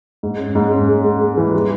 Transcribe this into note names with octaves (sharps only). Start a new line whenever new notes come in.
G#2
C#4
G#2
C#4
G#3
G#3
G#3
E3
G3